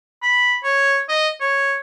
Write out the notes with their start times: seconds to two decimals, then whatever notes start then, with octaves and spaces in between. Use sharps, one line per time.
0.22 B5
0.63 C#5
1.09 D#5
1.40 C#5